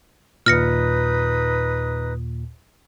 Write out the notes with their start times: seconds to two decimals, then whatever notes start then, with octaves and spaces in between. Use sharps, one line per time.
0.46 D#2 A#2 D#4 B4 D#6 F6 A#6 C#7